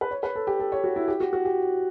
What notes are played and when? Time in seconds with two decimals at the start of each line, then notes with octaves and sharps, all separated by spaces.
0.01 B4
0.11 C#5
0.23 B4
0.35 A4
0.47 G4
0.60 A4
0.72 C#5
0.84 F#4
0.96 E4
1.08 G4
1.20 F#4
1.33 F#4
1.45 G4